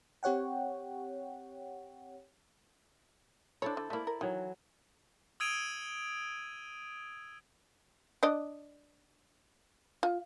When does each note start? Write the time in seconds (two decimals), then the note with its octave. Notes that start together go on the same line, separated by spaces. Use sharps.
0.23 C4 G4 C#5 F#5 G5
3.62 D4 E4 A4 C5 C#5
3.77 D3
3.90 A3 A#3 E4 D5 E5
4.07 A#4
4.21 D#3 E3 F#3
5.40 D#6 E6 G#6 D7 D#7 F7
8.23 D4 D5 D#5
10.03 F4